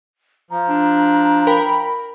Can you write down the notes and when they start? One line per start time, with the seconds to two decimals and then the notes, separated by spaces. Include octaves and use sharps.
0.51 F3 A#5
0.69 D4
1.47 A#4 G5 B5